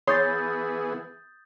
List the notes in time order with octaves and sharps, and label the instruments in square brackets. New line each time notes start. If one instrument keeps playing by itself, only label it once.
[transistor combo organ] E3 B3 G#4 [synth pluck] C#5 C6 [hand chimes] D#6 G6 A6